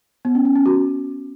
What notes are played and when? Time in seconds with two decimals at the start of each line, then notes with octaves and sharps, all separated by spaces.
0.25 B3
0.35 C#4
0.45 C#4
0.55 C#4
0.66 F#4